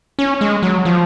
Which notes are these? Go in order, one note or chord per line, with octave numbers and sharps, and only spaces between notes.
C#4
G#3
F#3
F3